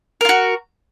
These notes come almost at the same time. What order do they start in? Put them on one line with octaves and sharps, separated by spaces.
A#4 F4 F#4